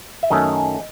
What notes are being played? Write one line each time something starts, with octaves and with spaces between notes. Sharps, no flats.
E5
F#2 D#3 A3 C#4 D#5